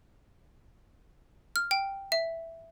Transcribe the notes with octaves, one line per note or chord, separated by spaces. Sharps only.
F6
G5
E5